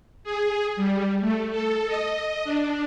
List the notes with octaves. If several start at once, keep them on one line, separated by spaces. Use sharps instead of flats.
G#4
G3
A3
A4
D#5
D4